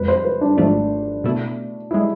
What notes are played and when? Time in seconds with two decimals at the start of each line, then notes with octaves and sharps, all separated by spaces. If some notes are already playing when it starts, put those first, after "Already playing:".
Already playing: F2 C3 G#3 B4
0.08 C5
0.25 B4
0.41 D4
0.57 G#1 G#2 F3 A3 D4
1.24 B2 A3 E4
1.91 G#3 E4